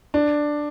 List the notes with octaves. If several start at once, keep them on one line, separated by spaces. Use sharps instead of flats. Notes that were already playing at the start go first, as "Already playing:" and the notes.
D4